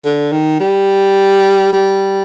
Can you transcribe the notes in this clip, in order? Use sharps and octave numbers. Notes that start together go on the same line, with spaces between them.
D3
D#3
G3
G3